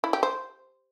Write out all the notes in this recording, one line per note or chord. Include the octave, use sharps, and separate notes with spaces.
E4
G4
C5